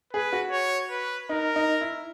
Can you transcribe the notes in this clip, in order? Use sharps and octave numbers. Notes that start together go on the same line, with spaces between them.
G#4 B4
F#4
C#5
B4
D#4 A#4
D#4
E4